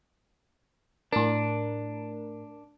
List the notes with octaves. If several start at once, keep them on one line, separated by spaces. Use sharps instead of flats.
A2 D4 A#4